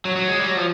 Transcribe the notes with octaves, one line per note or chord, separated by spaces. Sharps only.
F#3
F#3
G#3
G3
F#3
F3